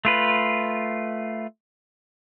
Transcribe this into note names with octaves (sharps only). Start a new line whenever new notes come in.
A3 F4 B4